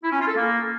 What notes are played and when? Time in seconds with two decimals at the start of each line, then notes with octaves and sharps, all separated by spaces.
0.04 E4
0.12 C#4
0.20 F4
0.28 A4
0.36 A#3